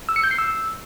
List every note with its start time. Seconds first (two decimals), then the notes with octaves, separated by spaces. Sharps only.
0.09 E6
0.16 C#7
0.24 G6
0.31 C7
0.38 E6